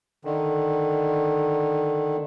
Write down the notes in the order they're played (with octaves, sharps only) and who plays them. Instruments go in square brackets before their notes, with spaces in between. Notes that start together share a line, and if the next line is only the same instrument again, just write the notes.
[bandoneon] D3 D#3